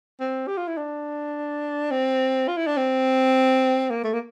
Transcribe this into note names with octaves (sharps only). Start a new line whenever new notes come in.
C4
G4
F4
E4
D4
C4
F4
E4
D4
C4
A#3
A3
A#3